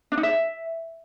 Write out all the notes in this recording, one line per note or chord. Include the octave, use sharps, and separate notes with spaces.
D4
D#4
E5